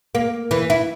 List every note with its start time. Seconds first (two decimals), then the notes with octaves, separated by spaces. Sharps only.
0.15 A#3
0.51 E3
0.70 E4